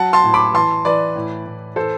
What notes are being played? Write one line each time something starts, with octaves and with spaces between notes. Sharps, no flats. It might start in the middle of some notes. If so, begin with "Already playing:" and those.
Already playing: F#3 F#5 A5
A5 C6
A2
B5 D6
E3 A5 C6
E3 B4 D5
A2
A2
E3 A4 C5